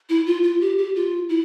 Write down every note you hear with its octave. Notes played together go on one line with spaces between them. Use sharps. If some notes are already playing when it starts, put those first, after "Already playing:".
E4
F4
F4
G4
G4
F4
E4